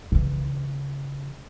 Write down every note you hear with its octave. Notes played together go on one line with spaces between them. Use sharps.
C#3 E3